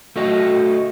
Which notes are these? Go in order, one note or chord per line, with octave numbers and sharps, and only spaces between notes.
A3 F#4 D#5